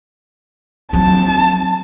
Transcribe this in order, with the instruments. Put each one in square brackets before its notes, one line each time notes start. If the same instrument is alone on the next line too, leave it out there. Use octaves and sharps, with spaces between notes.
[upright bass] F#3 C4 [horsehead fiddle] A5